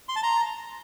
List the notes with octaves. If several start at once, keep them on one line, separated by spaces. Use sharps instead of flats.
C6
A5
A#5